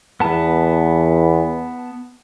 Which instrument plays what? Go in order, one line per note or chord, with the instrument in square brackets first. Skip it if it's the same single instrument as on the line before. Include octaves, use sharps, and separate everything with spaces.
[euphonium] E2 [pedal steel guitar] B3 A5